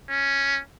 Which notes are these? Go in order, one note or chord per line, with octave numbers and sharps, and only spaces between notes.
C#4